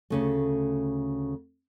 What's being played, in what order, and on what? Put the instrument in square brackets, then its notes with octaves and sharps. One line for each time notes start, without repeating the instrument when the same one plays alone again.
[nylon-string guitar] D2 C#3 A3